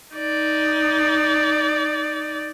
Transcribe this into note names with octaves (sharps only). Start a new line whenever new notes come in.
D#4 D5